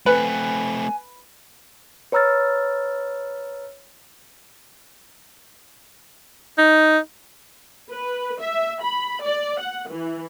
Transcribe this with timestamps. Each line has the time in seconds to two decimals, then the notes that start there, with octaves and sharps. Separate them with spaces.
0.06 A3 C4 B4 G#5
2.12 B4 C#5 A#5 E6 F6 A6
6.58 D#4
7.91 B4
8.41 E5
8.82 B5
9.22 D5
9.60 F#5
9.89 E3